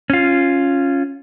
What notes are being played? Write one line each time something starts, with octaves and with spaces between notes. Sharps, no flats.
C#4 F4